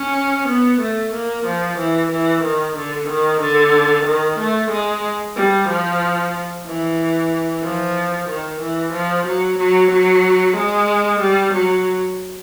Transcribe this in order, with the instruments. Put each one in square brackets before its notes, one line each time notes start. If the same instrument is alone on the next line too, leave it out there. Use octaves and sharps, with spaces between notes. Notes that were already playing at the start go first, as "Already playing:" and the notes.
Already playing: [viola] C#4
B3
A3
A#3
F3
E3
E3
D#3
D3
D#3
D3
D#3
A3
G#3
G3
F3
E3
F3
D#3
E3
F3
F#3
F#3
F#3
G#3
G3
F#3